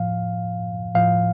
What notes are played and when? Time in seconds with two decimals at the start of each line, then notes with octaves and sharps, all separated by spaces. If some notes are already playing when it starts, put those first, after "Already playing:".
Already playing: A2 F3 F5
0.95 A2 F3 F5